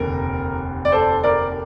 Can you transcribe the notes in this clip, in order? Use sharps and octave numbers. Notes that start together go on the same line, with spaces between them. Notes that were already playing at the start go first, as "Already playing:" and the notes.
Already playing: F1 D#2 D3 A#4
D5
A4 C5
A#4 D5